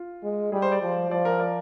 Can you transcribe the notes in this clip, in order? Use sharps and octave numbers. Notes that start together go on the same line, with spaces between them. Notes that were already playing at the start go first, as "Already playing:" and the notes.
Already playing: F4
G#3
G3 G#4
C5
D5
F3
F3 D5
A#4
D5